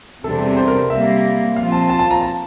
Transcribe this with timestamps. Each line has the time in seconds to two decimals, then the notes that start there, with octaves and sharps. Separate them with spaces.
0.24 E2 C3 G3 D4 A4
0.57 C5
0.68 A#4
0.90 C3 G3 A#3 E5
1.56 A#2 F3 C4 F4 F5
1.72 A5
1.89 A5
1.99 A5
2.11 A#5
2.21 A5